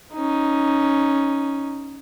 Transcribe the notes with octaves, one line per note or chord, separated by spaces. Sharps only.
C#4 D#4